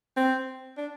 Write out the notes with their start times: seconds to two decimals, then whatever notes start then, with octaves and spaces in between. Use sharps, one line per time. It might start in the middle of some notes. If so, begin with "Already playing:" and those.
0.17 C4
0.77 D4